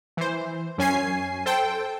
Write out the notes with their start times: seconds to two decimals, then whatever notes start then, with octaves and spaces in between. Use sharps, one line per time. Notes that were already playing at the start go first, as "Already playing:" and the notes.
0.17 E3 C5
0.78 F#2 C#4 G#5 C7
1.46 A4 C5 G5